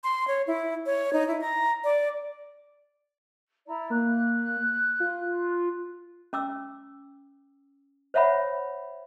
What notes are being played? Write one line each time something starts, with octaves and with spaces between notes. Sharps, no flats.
C6
C#5
E4
C#5
D#4
E4
A#5
D5
E4 D5 A#5
A#3 F#6
F4
C#4 D6 E6
C5 C#5 E5 F#5 B5